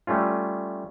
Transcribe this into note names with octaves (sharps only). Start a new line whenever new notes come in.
G3 A3 C#4 F4